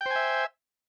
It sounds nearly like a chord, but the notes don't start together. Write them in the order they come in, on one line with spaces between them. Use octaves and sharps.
G5 C5 G#5 E5